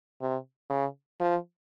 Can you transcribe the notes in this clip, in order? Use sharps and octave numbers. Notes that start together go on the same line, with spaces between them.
C3
C#3
F3